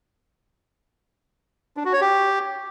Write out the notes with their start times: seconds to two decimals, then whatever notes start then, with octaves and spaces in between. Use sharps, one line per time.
1.77 D4
1.85 F#4
1.93 C#5
2.01 G4